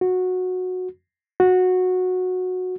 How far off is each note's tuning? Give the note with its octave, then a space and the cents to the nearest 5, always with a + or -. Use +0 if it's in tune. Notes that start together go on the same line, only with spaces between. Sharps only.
F#4 -15
F#4 -15